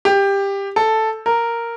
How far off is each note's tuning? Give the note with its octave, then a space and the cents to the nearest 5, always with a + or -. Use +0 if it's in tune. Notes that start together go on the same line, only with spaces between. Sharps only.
G4 +15
A4 +0
A#4 -5